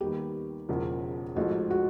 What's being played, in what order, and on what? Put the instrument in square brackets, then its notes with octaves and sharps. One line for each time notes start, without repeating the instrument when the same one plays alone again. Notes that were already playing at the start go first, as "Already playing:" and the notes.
[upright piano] D#2 D#3 G3 B3 [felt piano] G4
[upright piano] E1 E2 C#3 F3 A#3
[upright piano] A1 G#2 F3 A3 [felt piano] F#4
[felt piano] F#4